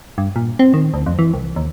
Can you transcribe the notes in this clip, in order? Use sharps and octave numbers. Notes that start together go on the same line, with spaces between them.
G2
A#2
C4
D#3
D2
F2
E3
C2
D#2